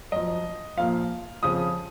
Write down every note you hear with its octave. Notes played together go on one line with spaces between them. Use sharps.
F#2 F3 D#5
A#2 F3 F5
F2 C#3 F3 D#6